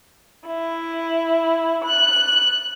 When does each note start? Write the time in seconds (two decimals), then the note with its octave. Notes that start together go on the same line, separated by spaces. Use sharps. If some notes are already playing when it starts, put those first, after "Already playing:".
0.48 E4
1.85 F#6